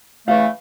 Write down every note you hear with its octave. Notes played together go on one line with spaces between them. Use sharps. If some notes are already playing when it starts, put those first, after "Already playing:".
C#3 E3 A3 F5